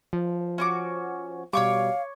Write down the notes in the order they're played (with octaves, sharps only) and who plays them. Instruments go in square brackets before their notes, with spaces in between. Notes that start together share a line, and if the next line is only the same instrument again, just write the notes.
[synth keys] F3
[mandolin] C#4 F#4 D6
[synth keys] B2 G3 [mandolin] C#5 C#6 D6 [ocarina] F5